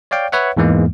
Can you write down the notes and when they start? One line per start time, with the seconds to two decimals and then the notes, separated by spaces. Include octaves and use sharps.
0.11 C#5 D5 F5 G5
0.32 B4 C#5 E5 F#5
0.57 E2 G#2 E3 G#3 A#3